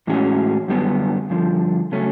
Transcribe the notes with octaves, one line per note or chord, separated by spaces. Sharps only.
A2 E3 G#3 C#4 F#4
F#2 D3 G3 B3
G2 D3 F3
C#3 F#3 A3 C#4